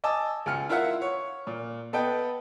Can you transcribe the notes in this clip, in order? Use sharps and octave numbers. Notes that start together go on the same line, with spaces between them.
D#5 G#5 A5 D6 E6
C#2 G#5 F6 C#7
E4 F4 A#4 E5 F#5
C#5
A#2
B3 A4 B4 D#5 G5